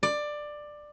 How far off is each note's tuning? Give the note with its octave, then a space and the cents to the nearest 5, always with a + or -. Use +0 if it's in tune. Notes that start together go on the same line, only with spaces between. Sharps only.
D5 +15